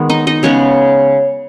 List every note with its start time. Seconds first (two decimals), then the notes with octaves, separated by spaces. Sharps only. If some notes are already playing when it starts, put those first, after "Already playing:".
Already playing: D#3 G#3 B3
0.10 D#4 D#5
0.27 D#4 D#5
0.43 C#3 G#3 B3 C#4 C#5